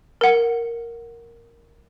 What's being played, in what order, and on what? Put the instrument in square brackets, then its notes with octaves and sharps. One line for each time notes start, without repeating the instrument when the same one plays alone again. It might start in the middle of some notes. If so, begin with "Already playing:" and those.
[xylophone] A#4 F#5